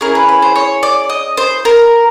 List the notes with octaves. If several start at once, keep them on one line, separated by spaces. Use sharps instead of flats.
C#4 E4 G#4 A#4
B4
B4
C5
C#5
D5
D#5
C5
A#4